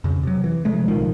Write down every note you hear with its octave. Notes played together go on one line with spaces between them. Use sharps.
F2 C#3
C3 F#3
E3
C3 F3 G#3 A3
B1 A2 D#3 F3